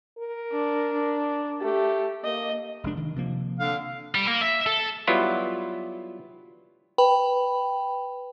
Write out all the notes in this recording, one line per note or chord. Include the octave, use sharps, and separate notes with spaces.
A#4
D4
D4
A3 G4
A#3 D#5
F1 G#3 D4
D#3
C3 F3 A#3
D3 F5
G3
A#3
E5
A4
F#3 G3 B3 E4 F4
B4 G5 B5